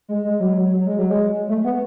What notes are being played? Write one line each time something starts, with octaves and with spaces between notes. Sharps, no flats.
G#3
G#3
F#3
F#3
F#3
G#3
F#3
G#3
A3
B3